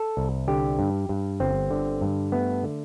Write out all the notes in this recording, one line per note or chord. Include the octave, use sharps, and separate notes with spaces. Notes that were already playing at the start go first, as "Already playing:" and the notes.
Already playing: A4
C2
D3 G4
G2
G2
G1 C4
D3
G2
A3 B3
D3